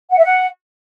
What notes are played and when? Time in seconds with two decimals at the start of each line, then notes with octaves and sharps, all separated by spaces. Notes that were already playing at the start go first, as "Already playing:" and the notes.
0.11 F#5
0.18 E5
0.24 F#5